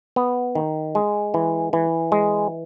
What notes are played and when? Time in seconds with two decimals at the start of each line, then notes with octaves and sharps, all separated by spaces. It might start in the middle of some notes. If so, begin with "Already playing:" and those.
0.16 B3
0.55 D#3
0.95 G#3
1.34 E3
1.73 E3
2.12 G#3